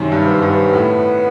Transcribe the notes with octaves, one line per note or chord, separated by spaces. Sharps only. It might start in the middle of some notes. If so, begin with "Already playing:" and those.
Already playing: F#2 C3 D#3
G2
B3
G2
B3
A2